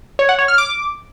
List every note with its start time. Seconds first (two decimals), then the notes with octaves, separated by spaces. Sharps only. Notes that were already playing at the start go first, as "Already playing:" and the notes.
0.19 C#5
0.29 F#5
0.39 C#5
0.48 F6
0.58 D6